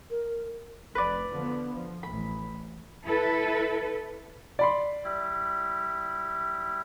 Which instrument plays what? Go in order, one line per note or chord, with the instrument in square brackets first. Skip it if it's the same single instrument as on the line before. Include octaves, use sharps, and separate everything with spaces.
[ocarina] A#4
[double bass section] F1 [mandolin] B4 D5
[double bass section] D3 F3 B3
F3
[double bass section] A1 [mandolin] B5
[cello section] E4 A4 B4
[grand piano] D5 B5 C6
[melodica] G3 E4